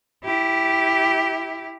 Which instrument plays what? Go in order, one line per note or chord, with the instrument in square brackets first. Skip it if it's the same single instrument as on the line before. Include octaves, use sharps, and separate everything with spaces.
[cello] E4 G4